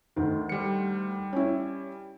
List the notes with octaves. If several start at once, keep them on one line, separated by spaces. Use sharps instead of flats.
D2 D#3
G3 C#7
C#4 E4